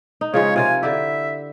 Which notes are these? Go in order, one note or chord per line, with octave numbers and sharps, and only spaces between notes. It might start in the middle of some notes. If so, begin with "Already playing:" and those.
D#4
C#3 F3 G#3 C#5
C3 F4 A#4 G#5
D3 E4 G4 E5